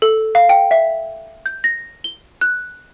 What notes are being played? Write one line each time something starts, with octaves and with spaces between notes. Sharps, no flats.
A4
F5
G5
E5
G6
A#6
G7
F#6